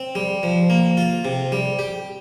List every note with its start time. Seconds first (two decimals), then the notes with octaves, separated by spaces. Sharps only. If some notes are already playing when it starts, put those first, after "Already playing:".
Already playing: C4
0.15 G3
0.43 F3
0.70 A#3
0.97 F4
1.25 C3
1.52 G3
1.79 G4